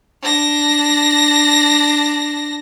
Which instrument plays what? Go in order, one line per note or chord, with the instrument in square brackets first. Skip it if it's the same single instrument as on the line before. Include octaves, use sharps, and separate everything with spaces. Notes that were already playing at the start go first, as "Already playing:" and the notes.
[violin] D4 A#6